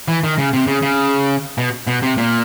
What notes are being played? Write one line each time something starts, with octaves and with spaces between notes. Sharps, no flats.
E3
D#3
C#3
C3
C#3
C#3
B2
B2
C3
A#2